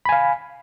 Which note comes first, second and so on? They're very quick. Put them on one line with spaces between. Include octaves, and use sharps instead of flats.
B5 G#5 F5